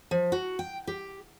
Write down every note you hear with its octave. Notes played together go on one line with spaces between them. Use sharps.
F3
F#4
G5
G4